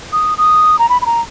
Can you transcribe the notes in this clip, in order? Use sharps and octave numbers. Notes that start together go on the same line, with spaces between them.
D#6
D#6
A#5
B5
B5
A#5